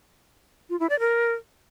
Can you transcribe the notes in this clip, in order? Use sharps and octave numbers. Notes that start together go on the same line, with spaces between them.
F4
E4
D5
A#4